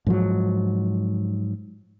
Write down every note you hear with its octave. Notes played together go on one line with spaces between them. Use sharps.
G#2 F3 F#3